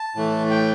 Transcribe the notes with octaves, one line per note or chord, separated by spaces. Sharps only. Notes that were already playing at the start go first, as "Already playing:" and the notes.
Already playing: A5
A2 E3 A3
G5